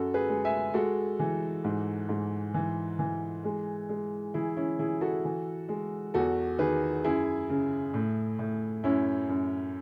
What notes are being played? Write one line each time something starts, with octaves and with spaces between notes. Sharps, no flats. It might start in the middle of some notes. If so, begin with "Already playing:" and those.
Already playing: F#2 F#4 A4
G#4 B4
G#3
E5 G#5
G#3 F#4 A4
E3
G#2
G#2
E3
E3
G#3
G#3
E3 E4 G#4
C#4 E4
E3 E4 G#4
F#4 A4
E3
G#3
E2 F#4 A4
D#3 G#4 B4
F#2 E4 G#4
C#3
A2
A2
F#2 C#4 E4
F#2